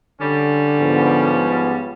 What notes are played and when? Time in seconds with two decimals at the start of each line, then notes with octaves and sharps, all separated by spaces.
0.21 D3 G3 C#4
0.80 G#2 F3 B3